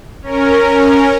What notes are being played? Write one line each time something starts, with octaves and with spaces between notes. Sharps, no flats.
C#4 A#4